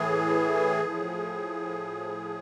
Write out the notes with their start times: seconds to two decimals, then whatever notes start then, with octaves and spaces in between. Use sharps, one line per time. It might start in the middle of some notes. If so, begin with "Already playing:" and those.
Already playing: A2 E3 G#4
0.86 A2 F3